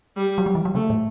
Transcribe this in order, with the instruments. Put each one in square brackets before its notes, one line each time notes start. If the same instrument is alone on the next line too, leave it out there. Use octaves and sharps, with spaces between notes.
[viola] G3
[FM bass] F#3
G3
E3
F#3
[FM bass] C#3 [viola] A3
[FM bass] A2